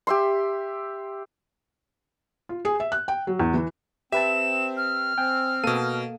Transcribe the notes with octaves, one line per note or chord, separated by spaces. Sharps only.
G4 E5 C6
F4
G#4
E5
F#6
G5
F#3
E2
E3
C4 G4 B4 E5 A5 E7
F6
C4 G5 G#5
B2 A#3 A4 F5 D#7